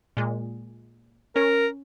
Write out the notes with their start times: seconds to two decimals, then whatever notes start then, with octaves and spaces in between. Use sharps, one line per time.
0.17 A#2 G#3
1.36 C#4 A#4